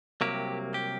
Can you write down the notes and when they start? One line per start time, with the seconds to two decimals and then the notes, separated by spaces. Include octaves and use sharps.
0.21 C2 C3 F#3 A#3 G4
0.74 G4